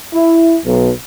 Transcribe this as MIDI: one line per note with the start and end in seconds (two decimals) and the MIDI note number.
0.14 0.56 64
0.65 0.90 35